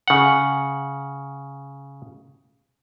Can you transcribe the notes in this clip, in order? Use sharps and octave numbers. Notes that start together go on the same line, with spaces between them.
C#3 F#5